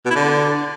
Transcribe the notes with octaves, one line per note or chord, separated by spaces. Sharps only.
B2
E4
D3